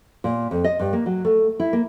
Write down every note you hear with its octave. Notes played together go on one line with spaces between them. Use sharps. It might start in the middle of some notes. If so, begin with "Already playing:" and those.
A#2
F2
D#5
G2
A#3
F#3
A3
E4
A#3